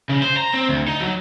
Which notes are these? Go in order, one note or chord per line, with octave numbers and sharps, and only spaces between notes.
C#3
C5
A#5
C4
D2
D#4
F#3